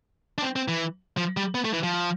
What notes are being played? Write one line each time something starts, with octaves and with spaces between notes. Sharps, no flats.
D4
C4
C4
E3
F3
G3
B3
A3
E3
F3